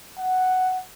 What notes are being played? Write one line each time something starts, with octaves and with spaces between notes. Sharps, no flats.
F#5